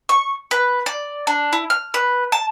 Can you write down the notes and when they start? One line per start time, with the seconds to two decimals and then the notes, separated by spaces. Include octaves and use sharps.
0.09 C#6
0.51 B4
0.86 D5
1.27 D4
1.53 E4
1.70 F6
1.94 B4
2.32 A5